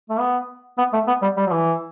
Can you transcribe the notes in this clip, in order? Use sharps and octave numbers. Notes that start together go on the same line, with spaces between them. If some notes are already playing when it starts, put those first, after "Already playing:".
A3
B3
B3
A3
B3
G3
G3
F#3
E3